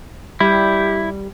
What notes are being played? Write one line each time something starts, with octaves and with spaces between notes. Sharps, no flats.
G3 E4 G4